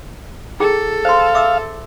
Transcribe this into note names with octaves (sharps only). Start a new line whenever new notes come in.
E4 G#4 A4 G5
C5 F5 C6
E5 D6 E6